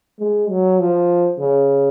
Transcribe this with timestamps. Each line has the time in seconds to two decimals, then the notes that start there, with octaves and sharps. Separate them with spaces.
0.19 G#3
0.50 F#3
0.79 F3
1.39 C#3